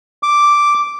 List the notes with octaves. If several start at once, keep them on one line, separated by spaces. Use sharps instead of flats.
D6